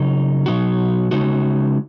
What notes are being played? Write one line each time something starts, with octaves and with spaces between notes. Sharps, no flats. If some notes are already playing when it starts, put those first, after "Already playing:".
Already playing: C#3 F#3 D#4
B2 F#3 D#4 F#4
C#3 G#3 D#4 F#4